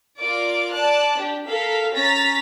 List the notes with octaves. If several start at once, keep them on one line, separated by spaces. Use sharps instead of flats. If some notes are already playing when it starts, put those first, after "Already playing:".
F4 A#4 D5 D6
D5 A5 F#6
D4 G4
A4 A#4 F5 B6
C#4 A#5 A6 B6